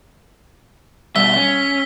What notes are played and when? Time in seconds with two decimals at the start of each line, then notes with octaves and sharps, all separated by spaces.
1.16 B2 G3 E5 E6 B6 G7
1.36 C#4